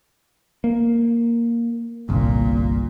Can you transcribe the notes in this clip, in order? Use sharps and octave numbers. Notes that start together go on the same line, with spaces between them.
A#3
G1 C2 A#2